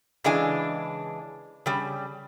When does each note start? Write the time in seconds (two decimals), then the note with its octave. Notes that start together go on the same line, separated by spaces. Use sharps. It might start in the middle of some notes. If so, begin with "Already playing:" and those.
0.24 C#3 E3 G#3 D4 G#5
1.66 C#3 G3